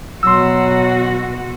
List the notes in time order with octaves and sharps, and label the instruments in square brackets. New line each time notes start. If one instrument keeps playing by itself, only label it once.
[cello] B2 F#4 [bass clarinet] F#3 [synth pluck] C6 E6